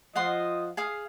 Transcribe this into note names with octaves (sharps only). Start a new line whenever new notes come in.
F3 D#5 F5 F#5 C6
G#4 F5 D#6